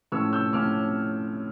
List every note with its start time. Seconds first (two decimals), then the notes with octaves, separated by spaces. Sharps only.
0.12 A2 F3 C#4 C#6 E6
0.33 E6 G6
0.53 A2 F3 C#4 D6 F6